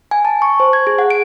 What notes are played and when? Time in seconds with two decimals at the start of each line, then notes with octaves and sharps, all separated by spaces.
0.11 G#5
0.25 A5
0.42 C#6
0.60 C5
0.73 G#6
0.87 G#4
0.99 F#5
1.10 D7